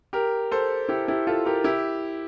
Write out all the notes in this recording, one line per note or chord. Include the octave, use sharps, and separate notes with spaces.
G4 A#4
A4 C5
E4 G4
E4 G4
F4 A4
G4 A#4
E4 G4